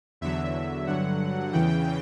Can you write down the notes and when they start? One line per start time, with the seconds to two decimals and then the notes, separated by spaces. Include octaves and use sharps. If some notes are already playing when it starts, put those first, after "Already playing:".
0.21 E2 D3 F#3 E5
0.87 G2 D3 F#3 F#5
1.53 E2 C#3 E3 G5